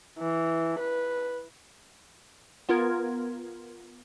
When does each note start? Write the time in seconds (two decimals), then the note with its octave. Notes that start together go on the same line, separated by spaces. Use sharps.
0.19 E3
0.80 B4
2.69 B3 F4 A#4 G#6